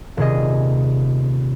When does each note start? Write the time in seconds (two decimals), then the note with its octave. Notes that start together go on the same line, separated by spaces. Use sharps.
0.17 D#1 C3 G#4 D#5